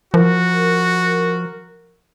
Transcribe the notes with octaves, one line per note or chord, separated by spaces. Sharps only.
F3 F#4 A#4